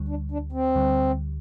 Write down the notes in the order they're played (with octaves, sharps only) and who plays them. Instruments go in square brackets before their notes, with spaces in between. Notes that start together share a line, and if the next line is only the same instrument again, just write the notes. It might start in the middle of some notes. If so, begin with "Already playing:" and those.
Already playing: [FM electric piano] D2 D3 G3
[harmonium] D4
D4
C4
[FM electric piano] D2 D3 G3